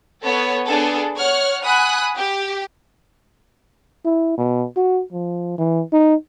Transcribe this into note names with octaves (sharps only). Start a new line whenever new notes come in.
B3 A4 C#5
B3 D4 G#4 A4
C#5 F#5 F6
F#5 G#5 B5 D#6 F#6
G4
E4
B2
F#4
F3
E3
D#4